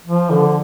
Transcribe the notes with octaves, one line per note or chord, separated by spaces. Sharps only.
F3
D3